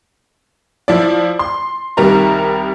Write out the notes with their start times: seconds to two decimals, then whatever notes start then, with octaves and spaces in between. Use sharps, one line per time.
0.88 F3 E4 D5
1.39 C6
1.97 C2 D#3 G3 A#4 A#5